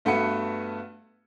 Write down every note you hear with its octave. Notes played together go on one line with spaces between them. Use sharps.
G2 A3 B3 F#4 B4 C#7